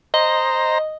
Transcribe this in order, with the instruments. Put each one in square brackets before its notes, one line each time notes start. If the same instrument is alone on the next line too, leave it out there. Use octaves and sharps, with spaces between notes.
[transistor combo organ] C5 A#5 [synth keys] D#5